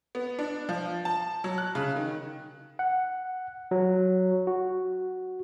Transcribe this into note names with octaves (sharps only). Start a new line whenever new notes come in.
B3
D4
F3
A5
F#3
F#6
C#3
D#3
F#5
F#3
F#4